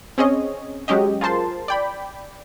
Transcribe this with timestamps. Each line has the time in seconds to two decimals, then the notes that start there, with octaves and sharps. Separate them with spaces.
0.18 C4 C#4 G#4 C#5 D#5
0.88 F#3 G#3 C#4 G4 D#5
1.21 F4 G#4 A#4 C5 A5 C6
1.68 D5 G5 B5